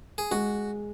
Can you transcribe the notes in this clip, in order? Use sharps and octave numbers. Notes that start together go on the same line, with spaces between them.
G#4
G#3 F#4